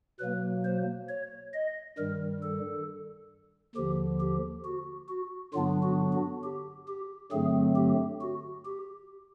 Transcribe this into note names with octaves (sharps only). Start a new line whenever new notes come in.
B2 F#3 A#3 B4
C5
C#5
D#5
G2 D#3 G3 A#4
A4
D#2 D3 F3 G4
G4
F#4
F#4
G2 D3 F#3 B3 D4 F4
F#4
F#4
G4
G4
G2 D3 F#3 A3 C4 G#4
G4
F#4
G4